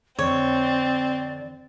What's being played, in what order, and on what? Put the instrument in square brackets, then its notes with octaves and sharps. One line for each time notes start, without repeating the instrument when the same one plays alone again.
[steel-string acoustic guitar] F2 D3 [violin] C4 [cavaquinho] C#5 [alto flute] D5